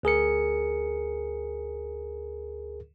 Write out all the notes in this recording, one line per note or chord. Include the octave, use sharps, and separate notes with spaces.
D2 G#4 A#4 C#7